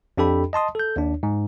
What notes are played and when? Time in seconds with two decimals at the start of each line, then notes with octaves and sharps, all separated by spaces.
0.17 F2 D4 G4 A4 G5 B5
0.53 D#5 A5 C6 D#6
0.75 A4 G6
0.96 D#2 D4
1.23 G#2